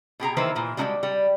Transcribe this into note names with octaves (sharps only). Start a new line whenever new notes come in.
B2 G4 G#4 A#5
D#3 E3 A#3 E4 B4 C5
A#2 E3
G3 G#3 D#4 E4 F#4 G4
G3